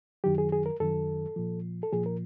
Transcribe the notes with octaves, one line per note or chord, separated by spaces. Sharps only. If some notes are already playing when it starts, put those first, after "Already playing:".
F#2 D#3 F#3 G4
G#4
G#4
A#4
F#2 D#3 F#3 A4
A#2 F3
A4
A#2 F3 G#4
A#4